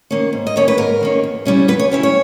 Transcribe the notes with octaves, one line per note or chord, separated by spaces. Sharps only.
D#3 A#3 C#4
G#2
D#5
D#3 A#3 C#4 C#5
B4
G#2 A#4
D#3 A#3 C#4
E2
C#3 G3 C#4 E4
E2 B4
C#5
C#3 G3 C#4 E4
C#5